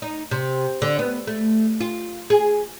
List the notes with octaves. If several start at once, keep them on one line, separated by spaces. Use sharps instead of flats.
D#4
C3
D3
B3
A3
F4
G#4